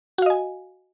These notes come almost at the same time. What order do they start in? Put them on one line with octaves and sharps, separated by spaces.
F#4 F5 D#5 G#5